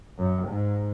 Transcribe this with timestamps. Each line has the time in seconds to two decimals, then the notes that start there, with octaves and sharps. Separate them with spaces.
0.18 F#2
0.48 G#2